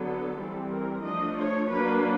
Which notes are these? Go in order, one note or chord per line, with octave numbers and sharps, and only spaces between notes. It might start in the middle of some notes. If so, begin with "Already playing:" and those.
Already playing: D3 F#3 B3 A4
E3 G3 C4
A#4
F3 A3 D4 D#5
C#5
F#3 A#3 D4 B4